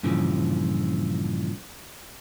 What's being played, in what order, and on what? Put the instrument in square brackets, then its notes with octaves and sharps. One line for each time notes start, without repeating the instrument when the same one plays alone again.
[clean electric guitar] G2 A#2 C#3 E3 F3